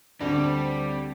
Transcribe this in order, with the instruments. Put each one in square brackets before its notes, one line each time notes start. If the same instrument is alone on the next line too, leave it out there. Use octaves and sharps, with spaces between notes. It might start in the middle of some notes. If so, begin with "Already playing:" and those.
[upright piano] D2 D4 A#6 [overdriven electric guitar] G3 [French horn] C4